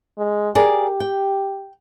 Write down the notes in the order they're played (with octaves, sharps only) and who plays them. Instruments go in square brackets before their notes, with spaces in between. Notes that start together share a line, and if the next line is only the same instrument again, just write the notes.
[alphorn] G#3
[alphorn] G4 [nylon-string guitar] G#4 A#4 D5
[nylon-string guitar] G5